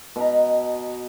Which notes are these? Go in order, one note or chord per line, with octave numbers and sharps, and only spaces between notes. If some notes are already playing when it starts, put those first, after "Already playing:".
B2 D#5 A#5